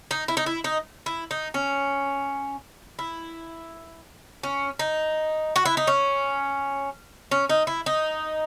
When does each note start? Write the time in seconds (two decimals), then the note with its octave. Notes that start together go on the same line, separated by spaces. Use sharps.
0.11 D#4
0.28 E4
0.37 D#4
0.46 E4
0.64 D#4
1.06 E4
1.31 D#4
1.54 C#4
2.99 E4
4.43 C#4
4.79 D#4
5.56 F#4
5.65 E4
5.77 D#4
5.87 C#4
7.31 C#4
7.50 D#4
7.67 E4
7.86 D#4